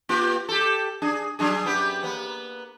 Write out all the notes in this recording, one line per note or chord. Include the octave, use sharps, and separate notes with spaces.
A#3 F4 G4
G4 A4
D4 G#4
F#3 D4 G#4
F#2 B3 G4
A#3 B3